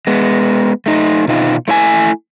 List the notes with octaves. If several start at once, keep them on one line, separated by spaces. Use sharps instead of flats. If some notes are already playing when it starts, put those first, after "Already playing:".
G#3 B3
A3 D#4
B2 D#4 F4
A3 E4 E5 G#5